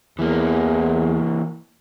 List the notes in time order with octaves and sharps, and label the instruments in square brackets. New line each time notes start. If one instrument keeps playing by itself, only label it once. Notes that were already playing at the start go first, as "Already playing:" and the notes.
[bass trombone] E2 [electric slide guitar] E3 A#3